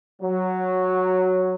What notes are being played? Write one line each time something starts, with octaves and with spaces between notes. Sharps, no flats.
F#3